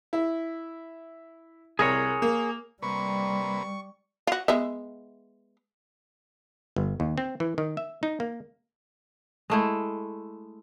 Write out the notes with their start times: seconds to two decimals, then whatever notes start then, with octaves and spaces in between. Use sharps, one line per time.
0.13 E4
1.79 C2 G#4 A#4 C#5
2.22 A#3
2.82 C3 G3 A#3 B4 C#6
4.27 F4 F#4
4.48 G#3 B3 E5
6.76 G1
7.00 D#2
7.18 C4
7.40 E3
7.58 D#3
7.77 E5
8.03 D#4
8.20 A#3
9.50 G#3 A3 E4